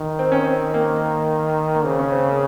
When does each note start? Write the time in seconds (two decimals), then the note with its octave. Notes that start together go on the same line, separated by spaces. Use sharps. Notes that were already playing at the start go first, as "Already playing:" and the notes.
Already playing: D#3
0.19 C4
0.32 C#4
0.44 C4
0.74 A#3
1.75 A#3
1.85 C#3 C4
1.99 C#4
2.12 C4
2.26 A#3